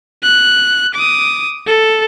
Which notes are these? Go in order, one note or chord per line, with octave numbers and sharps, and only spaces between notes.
F#6
D6 D#6
A4